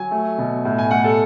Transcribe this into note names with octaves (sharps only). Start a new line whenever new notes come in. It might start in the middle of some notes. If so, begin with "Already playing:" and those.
Already playing: F#3 G#5
A3
B2
A2
G#5
A2 F#5
A4